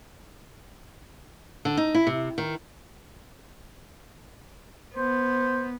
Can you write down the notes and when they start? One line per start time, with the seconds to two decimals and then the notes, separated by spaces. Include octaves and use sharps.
1.65 D3
1.77 D#4
1.94 E4
2.07 C3
2.38 D#3
4.96 B3 C5